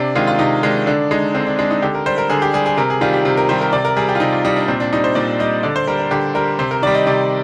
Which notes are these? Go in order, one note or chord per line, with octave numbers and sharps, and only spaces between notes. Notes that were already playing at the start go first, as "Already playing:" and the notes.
Already playing: C3 D4
D#3 G#3 F4
F4
C3 D#4
D#3 G#3 D4
D3 D4
G#3 D#4
D3 C4
D4
G#3 D4
D#4
D3 G4
A#4
G3 C5
A#4
D3 G#4
G4
G3 G#4
G#4
C3 A#4
G#4
D#3 G3 F4
G4
C3
A#4
D#3 G3 C5
A#4
C3 D5
A#4
G3 G#4
G4
F4
C3 D#4
F4
G3 D#4
D4
A#2 C4
D4
G3 D#4
C5
A#2 D5
G3 D#5
D3 D5
C5
G3 A#4
A#4
D3 G4
G3 A#4
C3 C5
A#4
D#3 G3 D5
D#5
C3 D5